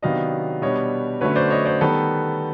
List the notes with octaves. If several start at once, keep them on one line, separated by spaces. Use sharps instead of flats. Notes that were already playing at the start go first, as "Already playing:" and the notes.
C3 D#3 F#3 B3 D4 D#5 F5
B2 G3 B3 D4 C#5 D#5
D3 F#3 A3 C#4 B4 C#5
C5 D5
C#5 D#5
C5 D5
D#3 G3 B3 A4 B4